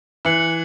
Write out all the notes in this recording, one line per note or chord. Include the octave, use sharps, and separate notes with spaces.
E3 F#6 C#7 F#7